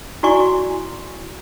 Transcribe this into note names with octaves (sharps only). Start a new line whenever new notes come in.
E4 F#4 D5 G#5 C#6